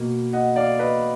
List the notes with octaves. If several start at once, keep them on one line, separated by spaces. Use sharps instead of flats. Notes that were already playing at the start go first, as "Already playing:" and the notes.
Already playing: B2 A#3
D#5 F#5
D5 F5
B4 D#5